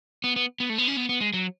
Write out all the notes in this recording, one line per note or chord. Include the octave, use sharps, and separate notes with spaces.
B3
B3
B3
A3
B3
C#4
B3
B3
G#3
F#3